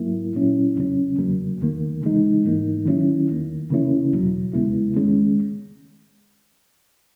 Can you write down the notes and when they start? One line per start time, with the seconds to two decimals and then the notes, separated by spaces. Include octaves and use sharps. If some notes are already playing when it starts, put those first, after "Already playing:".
Already playing: G#2 F#3 A#3 E4
0.34 A#2 F#3 C#4 E4
0.76 E2 C#3 F#3 C#4
1.18 E2 C#3 F#3 A#3
1.61 E2 D#3 A#3
2.02 C#3 E3 G#3 D#4
2.44 G#2 E3 A#3 D#4
2.86 D#3 F#3 C#4 E4
3.29 E2 D#3 A#3
3.71 C#3 E3 A#3 C#4 E4
4.13 E2 B2 F#3
4.53 E2 C#3 G#3 B3 E4
4.96 D#3 G#3 C#4